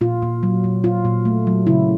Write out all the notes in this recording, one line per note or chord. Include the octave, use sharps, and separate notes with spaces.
A#2 F4
A#2
F#3
A#2
A#2 F4
A#2
A3
F#3
C#3 E4